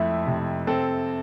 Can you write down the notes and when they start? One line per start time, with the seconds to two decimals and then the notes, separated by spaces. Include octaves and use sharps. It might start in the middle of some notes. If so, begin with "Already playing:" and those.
Already playing: F2 A3 E4 E5
0.27 C3
0.67 C4 A4